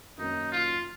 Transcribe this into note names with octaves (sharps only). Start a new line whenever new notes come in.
F#2 D#3 F#3 A#3 C#4 D#4
F4